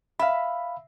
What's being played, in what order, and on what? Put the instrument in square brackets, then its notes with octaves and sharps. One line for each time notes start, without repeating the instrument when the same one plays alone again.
[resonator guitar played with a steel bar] E5 [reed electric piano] F5 B5